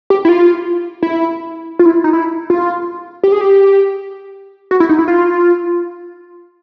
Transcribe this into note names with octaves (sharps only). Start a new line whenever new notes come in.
G4
E4
F4
E4
F4
E4
D#4
E4
F4
G4
G#4
G4
F#4
E4
D#4
E4
F4